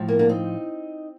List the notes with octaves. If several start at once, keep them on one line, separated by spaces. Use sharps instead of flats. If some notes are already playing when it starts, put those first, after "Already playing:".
Already playing: A2 F3
A#3
A#3 D4
C4 D#4